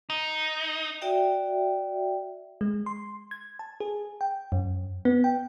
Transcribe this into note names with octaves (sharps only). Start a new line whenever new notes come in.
D#4
F#4 D5 E5 G5
G#3
C6
G#6
A5
G#4
G5
F#2
B3
G5